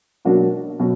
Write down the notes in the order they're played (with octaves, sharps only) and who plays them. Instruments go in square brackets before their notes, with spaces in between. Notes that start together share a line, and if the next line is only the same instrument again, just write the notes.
[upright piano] B2 F#3 A#3 D4 F#4
B2 F#3